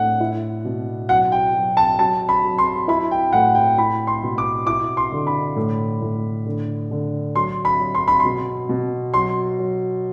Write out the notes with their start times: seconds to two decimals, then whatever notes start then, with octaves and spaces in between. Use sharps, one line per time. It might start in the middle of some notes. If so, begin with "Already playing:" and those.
Already playing: A2 D4 F#5
0.20 E4
0.65 B2
1.09 F#3 F#5
1.32 G5
1.55 F#3
1.77 A5
1.99 F#3 A5
2.29 B5
2.44 F#3
2.58 C6
2.88 E4 B5
3.11 G5
3.33 A2 F#5
3.55 G5
3.78 E4 B5
4.07 C6
4.23 B2
4.38 D6
4.67 E4 D6
4.97 C6
5.12 D3
5.27 B5
5.56 A2
6.02 A2
6.46 D3
6.91 D3
7.36 F#3 C6
7.65 B5
7.80 F#3
7.95 C6
8.08 B5
8.20 C6
8.25 B2
8.69 B2
9.14 F#3 C6
9.59 F#3